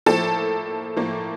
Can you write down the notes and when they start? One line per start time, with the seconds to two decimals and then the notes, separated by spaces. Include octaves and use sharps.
0.06 A2 F3 A#3 A4 A5
0.97 A2 F3 A#3